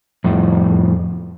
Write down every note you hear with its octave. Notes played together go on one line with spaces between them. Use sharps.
F2 A2